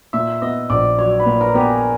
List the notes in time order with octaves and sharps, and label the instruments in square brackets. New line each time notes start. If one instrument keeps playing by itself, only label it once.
[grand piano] A#2 [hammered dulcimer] E5
[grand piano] B3 [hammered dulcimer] D#5
[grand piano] A#1 [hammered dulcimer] D5
[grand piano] F#3 [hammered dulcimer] C#5
[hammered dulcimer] B4
[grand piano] A#2
[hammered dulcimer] A#4
[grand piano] B3 [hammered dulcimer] G4
[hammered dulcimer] G#4